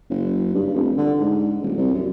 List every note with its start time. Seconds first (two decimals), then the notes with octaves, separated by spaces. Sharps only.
0.10 F#1
0.54 G2
0.74 F1
0.97 D3
1.19 G#2
1.62 D#1
1.78 C2
1.94 F#2